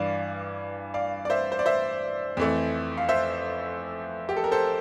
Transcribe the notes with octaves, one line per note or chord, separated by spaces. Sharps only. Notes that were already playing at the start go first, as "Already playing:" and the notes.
Already playing: G2 E3 D5 F5
D5 F5
D5
C5 E5
C5
D5
C5 E5
F2 E3 A3
F5
C5 E5
G4
A4
A#4
A4 C5